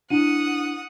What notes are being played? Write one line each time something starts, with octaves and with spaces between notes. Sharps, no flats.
D4 E4 F#5 D#6 D#7